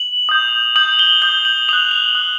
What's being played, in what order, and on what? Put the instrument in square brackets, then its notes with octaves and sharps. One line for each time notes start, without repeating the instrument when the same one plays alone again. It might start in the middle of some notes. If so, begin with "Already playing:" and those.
Already playing: [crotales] F#7
D#6 G6
D#6 G6 F#7
G7
D#6 G6 G7
F#7
D#6 F#6 F7
F#7
D#6 F#6